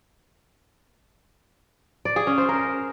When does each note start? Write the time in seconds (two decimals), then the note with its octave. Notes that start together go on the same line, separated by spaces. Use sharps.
2.05 D5
2.16 G#4
2.27 C#4
2.38 C5
2.49 A#4